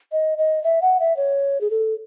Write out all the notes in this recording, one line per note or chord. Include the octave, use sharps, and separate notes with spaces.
D#5
D#5
E5
F#5
E5
C#5
G#4
A4